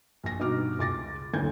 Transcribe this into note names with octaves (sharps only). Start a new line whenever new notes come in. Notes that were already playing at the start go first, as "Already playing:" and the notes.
A#1 A#6
G2 B2 D#4 F#4 D6 F6
C#2 D6 A6 A#6
D#1 D2 E3 G6 G#6